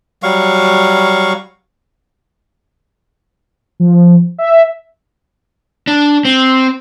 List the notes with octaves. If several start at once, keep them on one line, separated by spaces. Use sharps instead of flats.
F#3 G3 F5 C#6
F3
E5
D4
C4